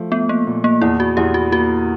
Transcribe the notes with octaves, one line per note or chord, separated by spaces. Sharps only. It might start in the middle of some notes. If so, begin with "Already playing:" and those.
Already playing: F3 A3
A3 B3
A#3
A#2
A#3
E2 E4
F#4
E2 G4
F#4
A#3 F#4